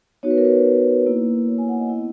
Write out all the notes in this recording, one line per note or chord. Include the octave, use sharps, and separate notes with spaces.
B3 D#4 F#4 C#5
B4
A#4
B4
A#3 E4
C#5
G#5
F#5
D#5
B3 E4